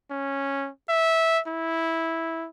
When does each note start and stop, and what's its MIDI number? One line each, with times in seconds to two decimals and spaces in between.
0.11 0.69 61
0.89 1.40 76
1.47 2.47 64